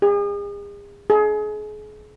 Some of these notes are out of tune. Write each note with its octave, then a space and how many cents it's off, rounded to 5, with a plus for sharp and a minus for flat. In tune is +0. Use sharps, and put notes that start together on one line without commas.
G#4 -40
G#4 +30